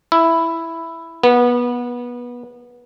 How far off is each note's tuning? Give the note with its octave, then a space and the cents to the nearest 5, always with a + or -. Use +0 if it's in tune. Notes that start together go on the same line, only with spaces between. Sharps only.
E4 +5
B3 -20